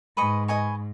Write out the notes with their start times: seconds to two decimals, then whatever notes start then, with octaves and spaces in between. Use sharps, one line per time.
0.17 G#2 B4 D#5 G#5 C#6
0.48 B4 D#5 G#5 C#6